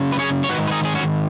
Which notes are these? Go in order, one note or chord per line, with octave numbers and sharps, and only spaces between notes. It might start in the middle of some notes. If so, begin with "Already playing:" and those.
Already playing: F#2 C#3
B4
G#4 C#5
C#5
G#2 D#3 F#4 B4
B4
D#4 G#4
G#4
C#4 F#4